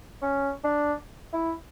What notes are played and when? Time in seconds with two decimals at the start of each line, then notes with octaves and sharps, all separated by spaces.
0.22 C#4
0.64 D4
1.33 E4